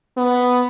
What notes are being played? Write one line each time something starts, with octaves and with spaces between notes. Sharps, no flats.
B3